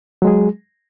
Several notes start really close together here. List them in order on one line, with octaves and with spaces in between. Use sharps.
F#3 G#3 G#4